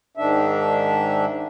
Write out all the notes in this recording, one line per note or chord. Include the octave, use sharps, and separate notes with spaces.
G#2 D#3 D4 E5